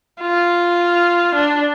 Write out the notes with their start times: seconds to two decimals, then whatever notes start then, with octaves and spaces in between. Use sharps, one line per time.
0.21 F4
1.35 D4